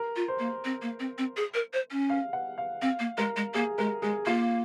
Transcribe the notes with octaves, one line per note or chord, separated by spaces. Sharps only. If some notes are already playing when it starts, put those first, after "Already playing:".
Already playing: A#4
F4
C5
A#3
C4
A#3
C4
C4
G#4
A#4
C5
C#4
F5
F#5
F5
C4 F5
A#3
G#3 A#4
G#3
A#3 G#4
G#3 A#4
G#3 G#4
A#3 F4